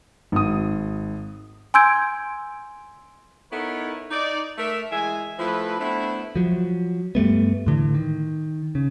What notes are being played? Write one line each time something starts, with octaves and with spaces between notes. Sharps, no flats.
G#1 D#6
G#5 C6 E6 G6 G#6 D7
B3 D#4 E4 A4 A#4 C#5
D#4 D5
A3 A4 A#4 E5
E3 G#3 G#4 E5 G#5
F3 A3 C4 E4 B4
A3 B3 C4 D4 E4
F3 F#3
G2 G3 A3 B3
A2 D3 E3
D#3
C#3